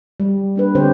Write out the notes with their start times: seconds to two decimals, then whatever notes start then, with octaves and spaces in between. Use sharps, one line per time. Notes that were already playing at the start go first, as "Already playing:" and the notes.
0.20 G3
0.56 A#3 D4 B4
0.75 D3 C4 D4 G4 C5 C#5